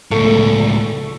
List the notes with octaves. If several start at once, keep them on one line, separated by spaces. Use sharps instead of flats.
C#2 A2 A3